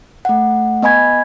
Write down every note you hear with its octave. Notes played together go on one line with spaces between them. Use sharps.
A3 F#5
B3 D#5 G#5 B5 G#6